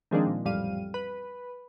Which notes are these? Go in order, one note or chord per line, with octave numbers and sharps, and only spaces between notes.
D#3 F3 G#3 A#3 C4 D4
A#2
A1 F2 G3 F5 D#7
B4